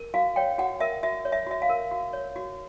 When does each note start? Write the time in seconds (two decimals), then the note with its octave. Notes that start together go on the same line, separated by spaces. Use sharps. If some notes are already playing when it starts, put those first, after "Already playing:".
Already playing: A#4
0.14 F#4 F5
0.36 C#5 G5
0.58 F#4 F#5
0.80 A#4 E5
1.03 F#4 E5
1.25 C#5
1.32 E5
1.47 F#4 E5
1.62 F5
1.69 A#4
1.91 F#4
2.13 C#5
2.36 F#4